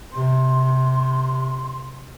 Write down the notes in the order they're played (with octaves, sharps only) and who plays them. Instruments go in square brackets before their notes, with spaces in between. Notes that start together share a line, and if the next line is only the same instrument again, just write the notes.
[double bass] C3 [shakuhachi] C6